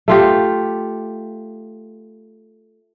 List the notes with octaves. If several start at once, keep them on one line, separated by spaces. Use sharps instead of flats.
A3 F4 G4